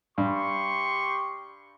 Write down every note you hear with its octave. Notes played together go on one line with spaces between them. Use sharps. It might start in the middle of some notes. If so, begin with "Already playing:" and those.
G2 G4 C6 C#6